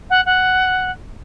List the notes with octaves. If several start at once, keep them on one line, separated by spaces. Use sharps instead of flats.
F#5
F#5